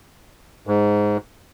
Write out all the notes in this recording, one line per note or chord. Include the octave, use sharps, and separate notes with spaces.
G#2